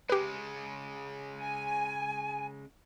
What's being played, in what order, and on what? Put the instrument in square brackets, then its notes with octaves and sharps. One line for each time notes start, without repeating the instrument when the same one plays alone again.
[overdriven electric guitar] C#3 G#3 [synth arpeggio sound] G4 B4
[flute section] G#5